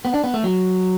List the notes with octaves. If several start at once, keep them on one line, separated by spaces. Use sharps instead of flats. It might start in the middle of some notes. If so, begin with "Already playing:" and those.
B3
D4
B3
A3
F#3